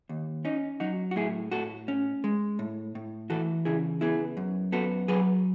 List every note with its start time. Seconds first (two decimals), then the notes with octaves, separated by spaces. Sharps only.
0.09 D#2
0.45 C#4 D#4
0.80 F#3 D#4 F#4
1.11 F#4
1.16 A2 E4 G#4
1.51 A2 F#4 A4
1.88 C#4
2.24 G#3
2.59 A2
2.95 A2
3.30 E3 F#4 A4
3.65 C#3 E4 G#4
4.01 B3 E4 G#4
4.37 F#2
4.72 B3 F#4 A4
5.08 F#3 G#4 B4